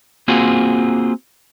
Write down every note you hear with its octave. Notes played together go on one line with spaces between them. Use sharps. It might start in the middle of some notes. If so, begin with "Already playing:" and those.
A#3 C4 F4 F#4 G#4